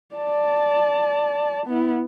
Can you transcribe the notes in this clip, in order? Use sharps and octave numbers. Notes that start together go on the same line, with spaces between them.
D5 A5
B3 E4